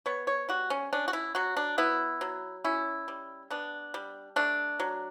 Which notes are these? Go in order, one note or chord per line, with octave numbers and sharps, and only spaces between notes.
B3 C#5
C#5
G3 F#4
C#4
C#4 D4
F#4
E4
F#3 F#4
D4
B3 E4
F#3
C#4 E4
G3
B3 D4
G3
A3 D4
F#3